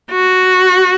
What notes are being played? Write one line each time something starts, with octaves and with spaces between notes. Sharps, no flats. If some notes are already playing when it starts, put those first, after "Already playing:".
F#4